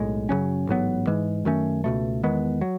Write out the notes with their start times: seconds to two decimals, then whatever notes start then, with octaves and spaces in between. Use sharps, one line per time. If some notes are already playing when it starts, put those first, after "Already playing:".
Already playing: B1 A2 G#3
0.29 F#2 C#3 F#3 C#4
0.67 A1 G#2 F#3 B3
1.07 G#2 E3 G#3
1.45 F#2 D#3 A3 C#4
1.84 C#2 B2 A3
2.24 E2 D#3 G#3 B3
2.61 F#3